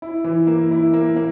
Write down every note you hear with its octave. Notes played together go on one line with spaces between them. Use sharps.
E4
E3
A#3
E4
A#3
A#3